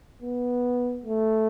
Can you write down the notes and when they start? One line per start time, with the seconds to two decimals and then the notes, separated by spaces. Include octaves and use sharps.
0.22 B3
1.05 A3